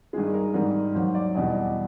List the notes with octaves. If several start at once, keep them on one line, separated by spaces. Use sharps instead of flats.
G2 D#3 G#3 G#4
A#4
G#2 D#3 G3 A#4
D#2 D#3 F#3 C5
D5
E2 B2 G3 D#5